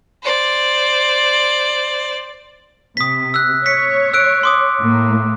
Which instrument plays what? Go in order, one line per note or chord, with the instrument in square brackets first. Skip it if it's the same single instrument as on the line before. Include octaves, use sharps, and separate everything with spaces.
[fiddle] C5 D5
[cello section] C3 [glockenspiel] D#6 B6
[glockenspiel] E6 F#6
[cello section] C#5 [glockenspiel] B6 C#7
[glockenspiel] E6 F#6 D7
C6 D6 D#6
[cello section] A2 A#3